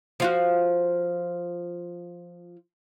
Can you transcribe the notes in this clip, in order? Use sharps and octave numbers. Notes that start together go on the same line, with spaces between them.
F3 F4 F#4